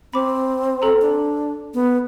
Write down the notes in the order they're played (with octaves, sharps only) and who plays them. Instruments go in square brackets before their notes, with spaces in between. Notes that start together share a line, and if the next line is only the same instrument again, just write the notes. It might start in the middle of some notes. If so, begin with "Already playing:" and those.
[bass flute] C4 [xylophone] B5 D6
[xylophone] A4 A#5
[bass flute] D4
B3